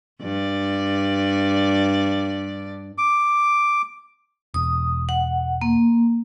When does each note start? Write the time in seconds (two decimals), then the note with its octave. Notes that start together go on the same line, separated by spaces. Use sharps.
0.22 G2 D5
2.98 D6
4.54 E1 D#6
5.09 F#5
5.62 A#3